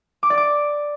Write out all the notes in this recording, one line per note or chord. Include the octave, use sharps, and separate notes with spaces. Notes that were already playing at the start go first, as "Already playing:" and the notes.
D6
D5
D6